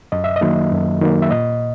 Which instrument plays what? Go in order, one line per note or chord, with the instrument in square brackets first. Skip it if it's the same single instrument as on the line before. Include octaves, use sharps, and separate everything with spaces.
[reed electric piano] F#2 D#5
E5
D#5
D#3 F#3 A#3
F#2
D#3 F#3 A#3
E5
A#2 D#5